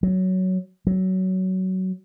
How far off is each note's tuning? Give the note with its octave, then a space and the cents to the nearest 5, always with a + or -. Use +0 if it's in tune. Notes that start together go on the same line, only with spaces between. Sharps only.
F#3 +10
F#3 +15